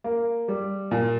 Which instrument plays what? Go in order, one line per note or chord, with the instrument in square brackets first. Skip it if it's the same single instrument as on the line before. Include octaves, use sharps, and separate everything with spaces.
[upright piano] A#3
G3
A#2